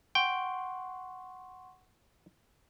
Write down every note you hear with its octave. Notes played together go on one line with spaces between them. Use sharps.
F#5 G5 C6 C#6